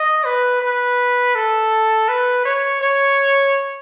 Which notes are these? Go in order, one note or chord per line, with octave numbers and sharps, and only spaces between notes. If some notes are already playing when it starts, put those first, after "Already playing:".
Already playing: D#5
B4
B4
A4
B4
C#5
C#5